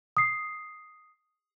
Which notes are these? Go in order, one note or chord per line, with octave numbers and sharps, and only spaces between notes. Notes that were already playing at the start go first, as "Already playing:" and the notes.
D#6 C7